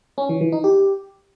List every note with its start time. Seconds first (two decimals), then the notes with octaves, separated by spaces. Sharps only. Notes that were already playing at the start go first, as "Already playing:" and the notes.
0.18 C#4
0.29 E3
0.41 E3
0.52 D#4
0.64 G4